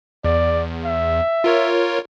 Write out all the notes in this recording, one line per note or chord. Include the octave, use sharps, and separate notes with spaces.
E2 D5
E5
F4 A#4 C#5